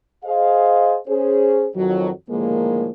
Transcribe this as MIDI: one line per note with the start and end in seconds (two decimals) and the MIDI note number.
0.25 0.96 68
0.25 0.96 72
0.25 0.96 75
0.25 0.96 77
1.08 1.68 61
1.08 1.68 68
1.08 1.68 72
1.76 2.10 41
1.76 2.10 51
1.76 2.10 53
1.76 2.10 54
2.30 2.91 45
2.30 2.91 50
2.30 2.91 51
2.30 2.91 53
2.30 2.91 56
2.30 2.91 58